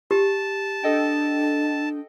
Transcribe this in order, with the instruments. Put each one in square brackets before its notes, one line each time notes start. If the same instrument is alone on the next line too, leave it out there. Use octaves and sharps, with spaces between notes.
[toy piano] G4 [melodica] A5
[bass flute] D4 [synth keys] A4 D#5 G5